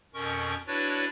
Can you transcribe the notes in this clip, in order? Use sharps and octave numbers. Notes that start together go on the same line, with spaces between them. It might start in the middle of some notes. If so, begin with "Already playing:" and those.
F2 B2 C#4 A#4 C#6
D4 E4 F#4 B4 C#5 D5